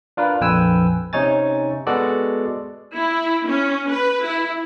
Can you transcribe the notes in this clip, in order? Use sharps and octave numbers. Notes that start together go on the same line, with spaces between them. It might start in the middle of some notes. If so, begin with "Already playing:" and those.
D4 F4 A#4 B4
A#1 F2 B4 G5 G#5 E6
C3 C#4 D#4 C#5 G#5 A6
G#3 B3 F#4 A4 D5
E4
C#4
B4
E4